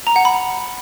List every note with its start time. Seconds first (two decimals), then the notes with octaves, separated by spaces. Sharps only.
0.07 A#5
0.16 F#5
0.25 B5